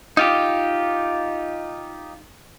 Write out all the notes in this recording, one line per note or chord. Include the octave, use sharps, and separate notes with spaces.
D#4 F4 G4